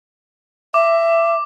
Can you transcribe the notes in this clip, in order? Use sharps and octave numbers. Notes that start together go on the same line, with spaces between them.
E5 D6